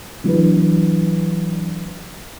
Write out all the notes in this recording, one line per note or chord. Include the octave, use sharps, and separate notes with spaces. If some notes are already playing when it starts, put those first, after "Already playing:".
E3 F#3 D4 B4